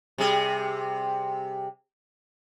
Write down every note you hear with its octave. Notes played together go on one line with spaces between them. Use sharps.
C3 G3 G#4